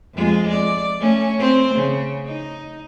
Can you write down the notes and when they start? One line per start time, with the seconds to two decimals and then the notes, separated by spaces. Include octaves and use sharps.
0.14 F2 G#3 F4
0.50 D5
0.99 A3 C#4
1.39 C4 C5
1.75 C#3
2.25 D#4